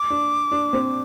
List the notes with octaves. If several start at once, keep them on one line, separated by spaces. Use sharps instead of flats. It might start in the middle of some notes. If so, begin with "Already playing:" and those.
Already playing: D6
D4
D4
C4